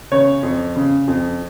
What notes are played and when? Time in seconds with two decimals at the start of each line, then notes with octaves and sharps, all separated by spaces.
0.12 C#3 C#5
0.43 F2
0.76 C#3
1.08 F2